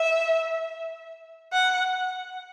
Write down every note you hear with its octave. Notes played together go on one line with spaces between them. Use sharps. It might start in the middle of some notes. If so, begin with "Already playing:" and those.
Already playing: E5
F#5